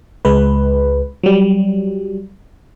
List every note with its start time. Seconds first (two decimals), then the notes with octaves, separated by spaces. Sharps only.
0.25 C#2 G#3 B4
1.23 F#3 G3